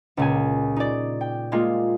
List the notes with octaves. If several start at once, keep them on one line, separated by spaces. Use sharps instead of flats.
C#2 A#2 G#5
D#4 D5
G5
G3 G#3 A#3 F4